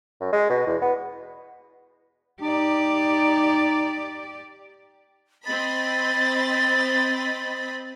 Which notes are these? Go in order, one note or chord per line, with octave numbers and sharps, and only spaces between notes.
F#2
G#3
B2
E2
B3
D#4 G4 D5
C4 D#5 B5 A6